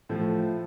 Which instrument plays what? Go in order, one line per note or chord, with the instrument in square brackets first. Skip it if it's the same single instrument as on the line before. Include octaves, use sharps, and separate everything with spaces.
[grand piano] A2 F3 A3